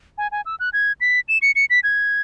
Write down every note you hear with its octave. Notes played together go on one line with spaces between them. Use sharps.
G#5
G#5
E6
F#6
G#6
B6
E7
C#7
C#7
B6
G#6